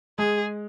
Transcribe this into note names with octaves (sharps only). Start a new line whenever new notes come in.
G#3 G#4